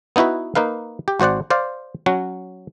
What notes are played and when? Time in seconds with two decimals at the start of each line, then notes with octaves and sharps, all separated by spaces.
0.16 B3 D#4 E4 F#4 B4
0.55 A#3 D#4 B4 F5
1.08 G4
1.20 G#1 F#4 C5 D5 F#5
1.50 C5 D5 F5
2.06 F#3 C#4 F#4